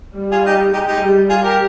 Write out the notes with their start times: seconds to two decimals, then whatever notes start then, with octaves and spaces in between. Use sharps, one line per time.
0.16 G3
0.31 F4 G#4
0.45 D#4 G4
0.73 G#3 D#4 G4
0.87 D#4 G4
1.01 G3
1.29 F4 G#4
1.43 G4 A#4